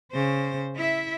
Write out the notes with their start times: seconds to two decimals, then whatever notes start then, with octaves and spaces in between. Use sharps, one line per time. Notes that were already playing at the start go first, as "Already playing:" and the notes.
0.12 C#3 C5
0.76 E4 E5